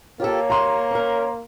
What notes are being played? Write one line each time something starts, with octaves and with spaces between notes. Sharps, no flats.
A#3 F4 G4 A4 C#5
D#2 A#5 C6
C#4 A#4